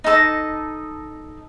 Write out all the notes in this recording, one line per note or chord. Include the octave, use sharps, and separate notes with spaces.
D#4 A4 D#5